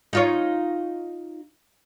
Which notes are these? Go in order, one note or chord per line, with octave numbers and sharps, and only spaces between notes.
D#4 F4 C#5